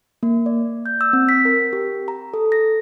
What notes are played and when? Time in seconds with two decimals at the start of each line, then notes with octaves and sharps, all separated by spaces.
0.23 A#3
0.46 D5
0.86 G6
1.01 E6
1.13 C4
1.29 B6
1.45 A#4
1.73 G4
2.08 A#5
2.34 A4
2.52 A#6